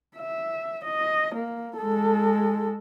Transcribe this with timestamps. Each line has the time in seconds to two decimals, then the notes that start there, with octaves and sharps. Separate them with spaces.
0.18 E5
0.85 D#5
1.35 A#3
1.78 G#3 A4